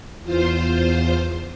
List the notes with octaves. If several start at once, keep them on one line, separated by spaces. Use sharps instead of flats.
E2 F4 C5